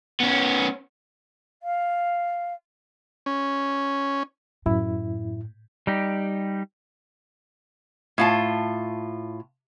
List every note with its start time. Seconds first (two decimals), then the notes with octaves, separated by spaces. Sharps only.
0.20 B3 C#4
1.62 F5
3.26 C#4
4.66 F#2 A2 E4
5.87 G3 D#4 G4
8.18 A2 F4 A5